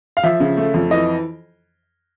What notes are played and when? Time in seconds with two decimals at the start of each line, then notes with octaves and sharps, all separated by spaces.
0.17 F5
0.23 F3 E5
0.40 C#3
0.57 A3
0.74 F2
0.91 E3 D#5